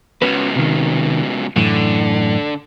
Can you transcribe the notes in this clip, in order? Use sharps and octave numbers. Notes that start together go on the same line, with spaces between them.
C#2 B2 B3 C#4 B4
C3 D#3
F#2 A2 D3 E3